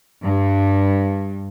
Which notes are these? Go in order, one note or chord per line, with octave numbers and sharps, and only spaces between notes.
G2